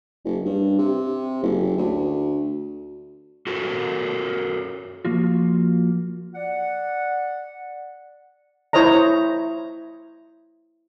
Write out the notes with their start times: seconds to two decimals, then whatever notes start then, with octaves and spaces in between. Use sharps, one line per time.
0.25 F#1
0.45 G2
0.78 C3
1.43 F#1
1.78 D2
3.47 F#4 A4 A#4
5.05 F3 A#3 F4 F#4
6.35 D5 F#5
8.73 E4 C5 C#5 D#5 A#5